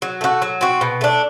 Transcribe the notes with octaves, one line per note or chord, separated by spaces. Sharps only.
F#3
A3 D4 F#4
F#3
C4 F#4
B2
A3 D4